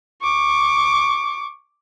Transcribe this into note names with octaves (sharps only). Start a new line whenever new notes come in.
C#6 D6